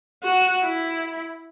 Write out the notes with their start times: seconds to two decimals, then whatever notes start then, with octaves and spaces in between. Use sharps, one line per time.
0.23 F#4
0.63 E4